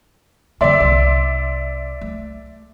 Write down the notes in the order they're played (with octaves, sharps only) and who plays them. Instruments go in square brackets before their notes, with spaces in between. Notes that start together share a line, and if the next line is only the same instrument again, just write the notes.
[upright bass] F#2 D3 [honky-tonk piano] D5 E5 C6
[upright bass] C2
A3